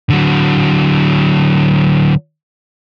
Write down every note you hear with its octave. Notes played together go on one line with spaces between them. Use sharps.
D3 F#3